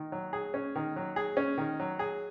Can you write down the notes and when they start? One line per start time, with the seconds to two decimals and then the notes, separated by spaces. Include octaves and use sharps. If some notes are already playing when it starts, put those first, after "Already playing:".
Already playing: D#3
0.12 F#3
0.33 G#4
0.54 C#4
0.75 D#3
0.96 F#3
1.16 G#4
1.37 C#4
1.58 D#3
1.80 F#3
1.99 G#4